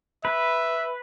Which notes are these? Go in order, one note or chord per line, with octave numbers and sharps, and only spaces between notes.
B4 E5